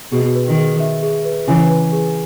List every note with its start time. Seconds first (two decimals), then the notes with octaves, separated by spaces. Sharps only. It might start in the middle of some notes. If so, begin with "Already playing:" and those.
0.12 B2 G#4
0.35 B4
0.46 D#3
0.58 G#4
0.80 E5
1.02 G#4
1.25 B4
1.48 C#3 E3 G#5
1.70 B4
1.92 G#4